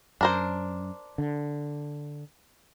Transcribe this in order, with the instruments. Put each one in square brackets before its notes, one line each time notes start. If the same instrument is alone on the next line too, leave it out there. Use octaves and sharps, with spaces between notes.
[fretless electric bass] F#2 [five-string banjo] D4 A#4 C5
[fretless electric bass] D3